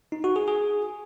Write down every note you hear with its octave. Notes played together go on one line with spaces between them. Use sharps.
D#4
F#4
G#4
G#4